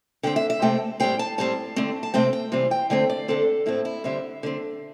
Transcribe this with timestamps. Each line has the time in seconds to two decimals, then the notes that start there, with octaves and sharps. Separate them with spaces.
0.23 D3 C4 G5
0.36 E5
0.50 E5
0.62 C3 A3 C4 G5
1.00 A2 G3 C4 G5
1.19 A5
1.38 A2 G3 C4 A5
1.76 D3 A3 C4
2.03 A5
2.14 C3 A3 C4 G5
2.33 G5
2.52 C3 E3 G3 C4
2.71 G5
2.90 D3 A3 C4 G5
3.09 D5
3.28 D3 C4 A4
3.66 A2 A3 C4 E4
3.85 E4
4.04 D3 G3 C4 E5
4.43 D3 C4